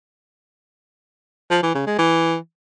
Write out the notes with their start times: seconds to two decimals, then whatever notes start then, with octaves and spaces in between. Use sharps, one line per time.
1.51 F3
1.63 E3
1.75 C#3
1.87 G#3
1.99 E3